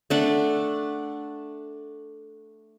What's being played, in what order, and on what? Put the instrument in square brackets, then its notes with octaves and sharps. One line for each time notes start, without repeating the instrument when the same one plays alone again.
[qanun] A3 D4 F#5